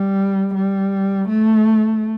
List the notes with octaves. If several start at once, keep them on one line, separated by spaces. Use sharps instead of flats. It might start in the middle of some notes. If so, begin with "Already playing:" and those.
Already playing: G3
G3
A3